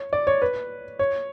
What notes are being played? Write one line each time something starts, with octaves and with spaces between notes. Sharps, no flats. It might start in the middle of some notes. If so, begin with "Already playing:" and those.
Already playing: C#5
D5
C#5
B4
C#5